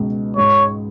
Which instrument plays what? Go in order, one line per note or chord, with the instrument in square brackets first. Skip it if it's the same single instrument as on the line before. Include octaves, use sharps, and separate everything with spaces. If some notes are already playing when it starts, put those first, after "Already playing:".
Already playing: [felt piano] C#2 B2
[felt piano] G#2 [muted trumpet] C#5